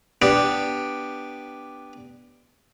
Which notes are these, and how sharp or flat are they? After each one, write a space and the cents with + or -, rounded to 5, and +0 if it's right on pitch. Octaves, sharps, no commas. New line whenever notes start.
B3 +0 D4 +0 G4 +0